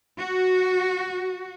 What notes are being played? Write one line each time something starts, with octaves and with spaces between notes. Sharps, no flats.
F#4